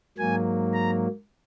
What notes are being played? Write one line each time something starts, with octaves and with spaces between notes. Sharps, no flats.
G#2 F#3 A#3 G#5
A#5